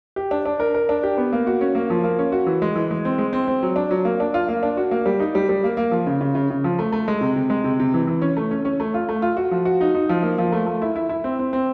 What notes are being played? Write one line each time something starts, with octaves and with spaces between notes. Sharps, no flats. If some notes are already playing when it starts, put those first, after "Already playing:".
G4
D4
D4
A#4
A#4
D4
G4
B3
A#3
F#4
C#4
A#3
F3
A#3
C#4
F#4
E3
G#3
E3
G#3
C4
G#3
C4
C4
F#3
D4
F#3
A#3
D4
F4
A#3
D4
F#4
A#3
G3
D#4
G3
G3
A#3
A#3
F3
C#3
C#3
C#3
C#3
F3
A3
A3
G#3
C3
C3
G#3
C3
C3
E3
E3
C#4
A3
C#4
C#4
A3
F4
A3
F4
F#4
F3
F#4
D#4
D#4
F3
A#3
F3
A3
A3
E4
E4
E4
C4
C4
C4